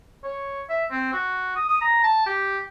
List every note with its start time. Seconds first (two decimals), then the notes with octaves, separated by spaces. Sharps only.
0.24 C#5
0.70 E5
0.91 C4
1.13 F#4
1.56 D#6
1.68 D#6
1.81 A#5
2.03 A5
2.26 G4